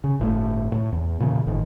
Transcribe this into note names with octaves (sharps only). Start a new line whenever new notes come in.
C#3
G1 A2 C#3 A3
A2
E2
A#2 C#3 E3
G1 A2 D#3